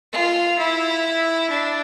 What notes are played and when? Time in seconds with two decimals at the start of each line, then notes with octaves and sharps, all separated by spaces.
0.12 F4
0.58 E4
1.49 D4